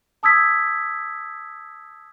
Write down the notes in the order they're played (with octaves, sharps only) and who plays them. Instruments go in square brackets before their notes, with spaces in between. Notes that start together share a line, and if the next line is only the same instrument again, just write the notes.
[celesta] A5 D#6 E6 G#6 B6